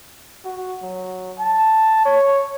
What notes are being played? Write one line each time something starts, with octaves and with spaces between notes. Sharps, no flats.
F#4
F#3
A5
C#5